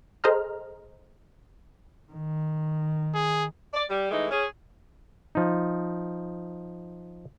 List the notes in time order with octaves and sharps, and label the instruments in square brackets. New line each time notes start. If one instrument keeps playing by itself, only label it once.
[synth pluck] G#4 A4 C5 D#5 A#5 F6
[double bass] D#3
[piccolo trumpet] G#4
[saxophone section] D5
G3
E3 G#3 A3 D#4
C#4 G#4
[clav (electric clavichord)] F3 D#4